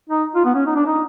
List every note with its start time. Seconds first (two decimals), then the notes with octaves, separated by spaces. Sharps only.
0.10 D#4
0.35 F4
0.45 B3
0.55 C#4
0.66 D#4
0.75 D4
0.86 D#4